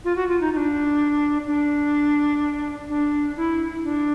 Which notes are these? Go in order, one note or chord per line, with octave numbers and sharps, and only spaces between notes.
F4
F#4
F4
D#4
D#4
D4
D4
D4
E4
D4